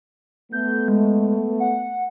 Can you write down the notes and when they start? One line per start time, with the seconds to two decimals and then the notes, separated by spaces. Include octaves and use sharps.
0.52 A3 B3 G6
0.88 G#3
1.60 F#5